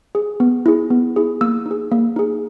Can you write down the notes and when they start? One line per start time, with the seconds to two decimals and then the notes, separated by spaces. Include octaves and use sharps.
0.15 G#4
0.40 B3
0.66 E4 G#4
0.90 B3
1.16 E4 G#4
1.41 A#3 E6
1.66 D#4
1.71 G#4
1.92 A#3
2.16 D#4 G#4